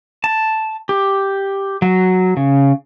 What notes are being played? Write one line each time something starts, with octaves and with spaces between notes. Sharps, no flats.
A5
G4
F#3
C#3